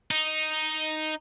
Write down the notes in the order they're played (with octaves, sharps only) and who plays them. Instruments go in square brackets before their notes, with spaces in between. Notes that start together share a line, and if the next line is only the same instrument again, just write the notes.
[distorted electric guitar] D#4